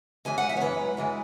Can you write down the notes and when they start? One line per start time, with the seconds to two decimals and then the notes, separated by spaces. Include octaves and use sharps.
0.25 F#2 E3 G#3 G#5
0.38 F#5
0.49 E5
0.57 C#5
0.61 F#2 E3 G#3 B4
0.97 F#2 E3 G#3